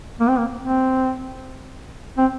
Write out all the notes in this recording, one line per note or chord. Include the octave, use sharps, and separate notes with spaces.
A#3
C4
A#3
C4
C4